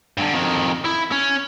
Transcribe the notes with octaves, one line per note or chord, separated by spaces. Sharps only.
G2 D3
F2 D#3
E4
C#4